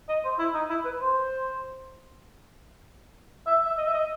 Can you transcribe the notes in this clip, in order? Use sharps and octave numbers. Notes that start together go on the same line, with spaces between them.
D#5
C5
E4
D#4
E4
B4
C5
E5
E5
D#5
E5
D#5